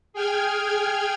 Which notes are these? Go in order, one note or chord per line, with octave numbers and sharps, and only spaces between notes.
G#4 G5 F6 G#6